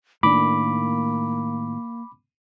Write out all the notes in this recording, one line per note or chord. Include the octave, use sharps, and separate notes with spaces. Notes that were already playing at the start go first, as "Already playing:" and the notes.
A2 D#3 A#3 D4 B5 D6